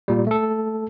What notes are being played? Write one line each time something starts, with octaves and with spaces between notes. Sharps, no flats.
A#2 G3
A3 A4